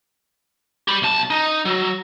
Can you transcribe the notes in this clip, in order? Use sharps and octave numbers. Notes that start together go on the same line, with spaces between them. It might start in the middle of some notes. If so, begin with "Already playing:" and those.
G4 B5
B1 A5
D#4
F#3